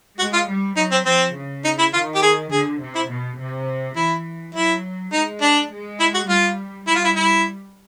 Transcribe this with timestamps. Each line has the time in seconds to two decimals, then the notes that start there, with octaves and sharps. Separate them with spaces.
0.19 G#3 F#4
0.33 F4
0.48 G3
0.76 F#3 D#4
0.91 C4
1.06 F3 C4
1.35 C#3
1.64 D#4
1.78 E4
1.93 D#3 F4
2.15 G4
2.23 G#4
2.51 D3 G#4
2.80 C3
2.95 E4
3.09 B2
3.38 C3
3.96 E3 E4
4.54 F#3 E4
5.13 G#3 D#4
5.41 D4
5.70 G#3
6.00 E4
6.14 F#4
6.28 G3 F4
6.87 G3 E4
6.95 F4
7.04 E4
7.16 E4